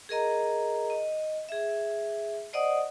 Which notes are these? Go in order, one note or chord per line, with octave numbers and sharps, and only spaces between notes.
G#4 A#4 D#5 A#5
D#5
G#4 E5
C5 D5 D#5 F#5 D#6